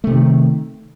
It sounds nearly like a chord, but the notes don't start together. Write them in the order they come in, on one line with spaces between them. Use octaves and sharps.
A3 C3 D#3